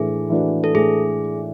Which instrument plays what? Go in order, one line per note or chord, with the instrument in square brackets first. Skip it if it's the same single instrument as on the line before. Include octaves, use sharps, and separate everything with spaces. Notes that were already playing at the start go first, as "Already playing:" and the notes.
Already playing: [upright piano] A2 E3 A3 D4 [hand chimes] G#4
[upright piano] E3 A3 D4 F#4
[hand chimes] A4
[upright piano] A2 [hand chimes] G#4